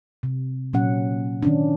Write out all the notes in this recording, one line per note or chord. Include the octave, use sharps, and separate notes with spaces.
C3
A#2 F#3 C#4 F#5
D#3 C#4 D4